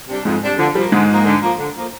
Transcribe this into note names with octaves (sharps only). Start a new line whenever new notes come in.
C3 G3 D4
F2 G#2 G#3
C3 G3 D4
D3 F3
F3 G3 A#3
G#2 D3 G#3
F3 A#3
D3
F3 A#3
D3
F3 A#3